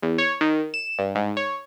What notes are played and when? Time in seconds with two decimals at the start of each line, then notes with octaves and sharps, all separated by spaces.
0.03 E2
0.18 C#5
0.41 D#3
0.74 E7
0.99 G2
1.15 G#2
1.37 C#5